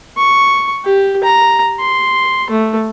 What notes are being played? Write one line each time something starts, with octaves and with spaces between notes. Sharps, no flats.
C#6
G4
A#5
C6
A3